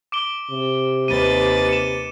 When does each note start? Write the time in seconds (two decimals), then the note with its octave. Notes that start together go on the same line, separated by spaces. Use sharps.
0.12 D6 D7 G7
0.51 C3
1.08 D#2 B4 A6 D#7
1.69 C#7 E7